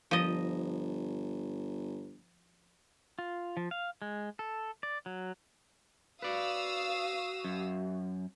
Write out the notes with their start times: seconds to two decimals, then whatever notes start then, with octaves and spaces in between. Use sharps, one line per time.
0.11 G1 F3 D#5
3.19 F4
3.57 F3
3.71 F5
4.02 G#3
4.39 A4
4.83 D5
5.06 F#3
6.22 F#4 B4 D5 F5 D#6 E6
7.44 F#2